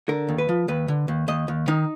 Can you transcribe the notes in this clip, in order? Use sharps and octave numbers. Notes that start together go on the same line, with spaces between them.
D3 A#4
D#2
B4
F3
D#2 B4
D3
D#2
D#2 D#5
D#2
D#3 D#4